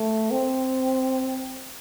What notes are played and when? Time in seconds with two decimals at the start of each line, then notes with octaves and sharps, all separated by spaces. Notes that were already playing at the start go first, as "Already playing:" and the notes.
Already playing: A3
0.31 C4